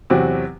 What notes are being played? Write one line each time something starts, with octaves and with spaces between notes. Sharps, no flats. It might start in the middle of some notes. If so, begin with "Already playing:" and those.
E2 C3 F#3 C4 F#4